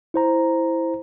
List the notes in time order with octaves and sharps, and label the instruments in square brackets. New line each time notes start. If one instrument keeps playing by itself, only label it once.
[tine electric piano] E4 C5 A#5